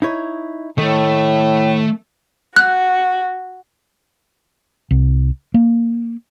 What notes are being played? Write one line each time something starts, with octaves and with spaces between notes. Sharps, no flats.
D#4 E4 C#5
A2 D#3 A3
F#4 F#6
C2
A#3